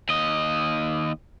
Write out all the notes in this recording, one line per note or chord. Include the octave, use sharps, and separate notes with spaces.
D#2 D#5